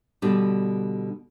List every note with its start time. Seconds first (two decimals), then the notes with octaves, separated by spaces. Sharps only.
0.22 B2 D3 G3 D4